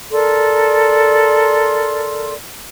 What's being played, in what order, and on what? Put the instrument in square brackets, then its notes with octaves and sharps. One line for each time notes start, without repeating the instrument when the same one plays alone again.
[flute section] A4 A#4 D5 C6